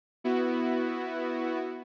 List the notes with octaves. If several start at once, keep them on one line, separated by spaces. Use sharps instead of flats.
B3 E4 F#4